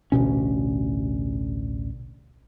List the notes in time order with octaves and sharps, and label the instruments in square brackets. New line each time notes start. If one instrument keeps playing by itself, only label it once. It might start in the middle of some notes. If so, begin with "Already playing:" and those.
[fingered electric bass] A1 D2 B2 C#4